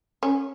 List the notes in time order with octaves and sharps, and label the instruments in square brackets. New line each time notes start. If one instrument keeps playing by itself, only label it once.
[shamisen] C#4